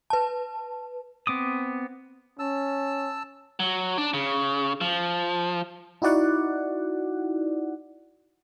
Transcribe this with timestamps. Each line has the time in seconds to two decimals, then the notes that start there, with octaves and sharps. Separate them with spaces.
0.10 B4 A5
1.27 B3 C4 D6 D#6
2.39 C#4 A5 E6
3.60 F#3
3.98 D4
4.14 C#3
4.81 F3
6.02 D#4 E4 F#4 D5 F#5